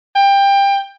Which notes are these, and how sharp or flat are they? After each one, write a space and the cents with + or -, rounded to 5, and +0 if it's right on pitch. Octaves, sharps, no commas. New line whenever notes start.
G5 +20